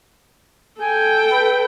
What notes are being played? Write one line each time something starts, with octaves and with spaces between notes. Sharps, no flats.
A4 G5 G#5
B4